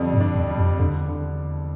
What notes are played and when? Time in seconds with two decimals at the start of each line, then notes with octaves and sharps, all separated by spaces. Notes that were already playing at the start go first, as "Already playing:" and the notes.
Already playing: F2 D3 G3 D4
0.13 G2
0.20 D4
0.36 E2
0.50 G3
0.57 F2
0.79 E2 D3
1.09 D3